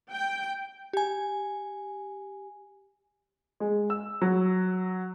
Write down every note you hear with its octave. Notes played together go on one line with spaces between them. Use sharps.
G5
G4 G#5
G#3
E6
F#3